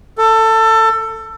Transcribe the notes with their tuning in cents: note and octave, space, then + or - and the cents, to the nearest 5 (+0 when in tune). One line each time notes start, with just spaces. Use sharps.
A4 +20